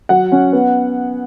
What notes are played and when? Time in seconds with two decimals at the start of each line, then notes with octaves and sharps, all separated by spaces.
0.09 F#3 F#5
0.32 C#4
0.53 B3